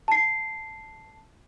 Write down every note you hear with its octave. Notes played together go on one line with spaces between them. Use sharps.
A5 C7